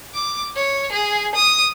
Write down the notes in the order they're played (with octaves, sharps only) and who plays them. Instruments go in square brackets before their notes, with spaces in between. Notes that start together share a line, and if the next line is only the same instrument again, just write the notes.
[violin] D6
C#5
G#4
D#6